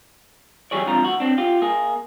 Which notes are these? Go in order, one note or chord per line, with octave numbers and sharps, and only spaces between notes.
E3 F#3 G4 G#4 C#5 D5
C#2 C3 F3 D4 F4 A#5
D2 F#4
C4 D4
F4 G4
A#3 G#4